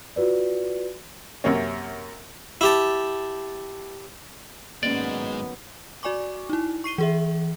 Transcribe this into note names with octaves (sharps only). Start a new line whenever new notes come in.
F4 F#4 B4 D5
F#2 C3 A#3 C#4
E4 G4 A5
G#2 D#3 F#3 G#3 A#3 B3 C#4 D5
F#4 D5 G#5 C#6 D6
D#4 E4
C#6 C7 D#7 G7
E3 G#4 E5